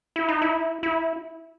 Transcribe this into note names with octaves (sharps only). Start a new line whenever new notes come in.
E4
D#4
E4
E4